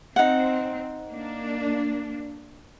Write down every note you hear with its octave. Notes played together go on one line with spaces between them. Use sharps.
C4 D#4 F#5
A#3 D4